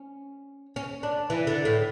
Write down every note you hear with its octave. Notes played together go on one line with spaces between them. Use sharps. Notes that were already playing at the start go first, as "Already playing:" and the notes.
Already playing: C#4
C#4
D4
E3
D3
A2